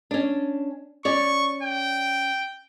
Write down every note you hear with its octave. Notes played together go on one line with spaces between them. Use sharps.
C#4 D4
C#4 D5 C#6
G5